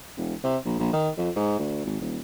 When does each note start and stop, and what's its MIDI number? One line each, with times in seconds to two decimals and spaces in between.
0.17 0.34 28
0.44 0.57 48
0.65 0.76 34
0.79 0.93 34
0.93 1.09 51
1.17 1.30 41
1.36 1.58 44
1.59 1.81 38
1.85 1.99 32
2.01 2.19 27